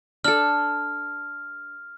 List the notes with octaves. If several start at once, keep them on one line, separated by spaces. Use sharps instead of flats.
D4 A4 F6